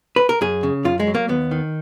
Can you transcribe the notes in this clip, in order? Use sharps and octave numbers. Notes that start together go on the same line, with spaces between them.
B4
A#4
F#2 G#4
C#3
F#2 F4
G#3
F#3
A#3
D#2 B3
D#3